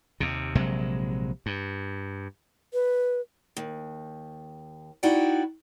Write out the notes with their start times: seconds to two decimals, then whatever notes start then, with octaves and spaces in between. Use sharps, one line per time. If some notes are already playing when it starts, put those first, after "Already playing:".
0.20 D#2 C3
0.55 A#1 C3 F#3 G#3
1.46 G2
2.73 B4
3.57 D#2
5.03 D#4 E4 F#4 D5 F#5 G5